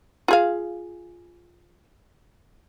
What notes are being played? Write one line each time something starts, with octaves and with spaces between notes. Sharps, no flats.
F4 G#4 F5